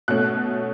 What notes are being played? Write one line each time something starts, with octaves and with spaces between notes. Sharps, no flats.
B2 A3 C#4 F#6